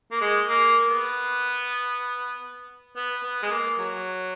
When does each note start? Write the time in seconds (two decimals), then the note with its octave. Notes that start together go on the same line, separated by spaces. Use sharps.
0.12 A#3
0.21 G#3
0.48 A#3
0.89 B3
2.96 B3
3.23 B3
3.42 G#3
3.51 A#3
3.79 F#3